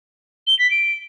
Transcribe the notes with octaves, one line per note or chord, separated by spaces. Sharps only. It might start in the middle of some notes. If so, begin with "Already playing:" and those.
G7
B6
D7